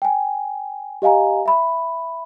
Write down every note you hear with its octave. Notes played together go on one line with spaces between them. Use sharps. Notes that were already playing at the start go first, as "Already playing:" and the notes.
G5 G#5
G4 D#5 F5 G#5 A#5
E5 B5